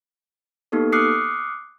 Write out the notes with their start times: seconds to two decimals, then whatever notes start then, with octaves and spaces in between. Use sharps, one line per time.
0.72 A#3 B3 D#4 G4 A4
0.92 D6 D#6 F6 F#6 C7 C#7